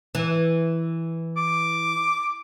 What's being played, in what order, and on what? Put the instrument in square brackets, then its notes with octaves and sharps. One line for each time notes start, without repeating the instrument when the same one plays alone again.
[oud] E3
[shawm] D6